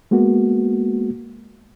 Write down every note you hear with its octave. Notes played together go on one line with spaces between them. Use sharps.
G#3 A#3 B3 F#4